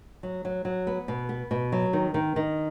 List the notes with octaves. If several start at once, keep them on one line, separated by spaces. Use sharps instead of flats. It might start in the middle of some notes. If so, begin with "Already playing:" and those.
F#3
F#3
F#3
B3
B2
B3
B2
F#3
D#3
D#3
D#3